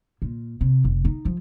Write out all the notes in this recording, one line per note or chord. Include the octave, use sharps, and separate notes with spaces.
A#2
C3
F1
D#4
F3